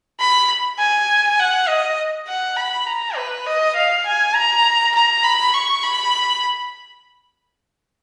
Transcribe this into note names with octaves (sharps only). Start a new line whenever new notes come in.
B5
G#5
F#5
D#5
F#5
B5
A#5
B4
D#5
F5
G#5
A#5
A#5
B5
C#6
B5